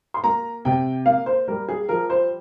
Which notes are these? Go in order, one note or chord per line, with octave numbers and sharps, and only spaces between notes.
C6
A#3 A#5
C3 G5
A#3 F5
C5
G3 A#4
G#4
F3 A#4
C5